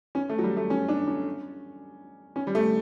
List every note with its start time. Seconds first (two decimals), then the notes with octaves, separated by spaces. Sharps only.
0.15 C#4
0.29 A3
0.38 F#3
0.43 G3
0.57 A3
0.70 C#4
0.88 D4
1.07 C#4
2.36 C#4
2.47 G3
2.55 A3